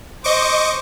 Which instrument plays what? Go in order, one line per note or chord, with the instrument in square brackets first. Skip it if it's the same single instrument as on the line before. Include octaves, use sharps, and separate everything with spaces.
[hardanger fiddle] C5 [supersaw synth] D#5 C#6 D6